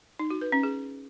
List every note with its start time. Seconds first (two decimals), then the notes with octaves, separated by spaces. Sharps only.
0.19 D#4
0.30 F#4
0.41 B4
0.52 C#4
0.63 G#4